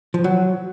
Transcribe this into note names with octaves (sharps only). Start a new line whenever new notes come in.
F3
F#3